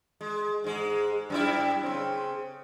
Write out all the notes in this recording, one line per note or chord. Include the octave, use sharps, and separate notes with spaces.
G#3
G#2 G#3
F#2 G3 E4
C#3 C4